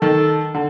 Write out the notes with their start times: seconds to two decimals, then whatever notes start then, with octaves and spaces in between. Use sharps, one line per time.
0.02 D#3 A4
0.54 D3